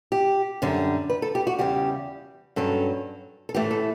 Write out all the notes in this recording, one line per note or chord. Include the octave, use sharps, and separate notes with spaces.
G4
F#2 D3 G3
B4
A4
G4
F#4
E2 C#3 G3 G4
G2 F#3 C#4 A4
A4
A2 E3 A3 G4
A4